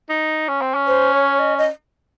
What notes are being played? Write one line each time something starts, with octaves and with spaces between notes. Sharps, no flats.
D#4
C#4
C4
C#4
C5
C#5
D#5
D#5